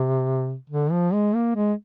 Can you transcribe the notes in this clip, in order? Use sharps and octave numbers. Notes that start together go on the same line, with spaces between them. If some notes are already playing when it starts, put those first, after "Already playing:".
Already playing: C3
D3
F3
G#3
A#3
G#3